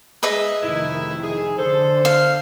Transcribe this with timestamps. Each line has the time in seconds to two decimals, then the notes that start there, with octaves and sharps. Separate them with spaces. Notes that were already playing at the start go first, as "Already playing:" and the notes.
0.23 G#3 G#4 B4 D#5 E5
0.63 F1 D#3 A3 D#4 E4
1.23 G#4
1.58 D3 A4 C5
2.05 F5